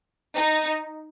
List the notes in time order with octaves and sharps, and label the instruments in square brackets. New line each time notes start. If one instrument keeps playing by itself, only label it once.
[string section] D#4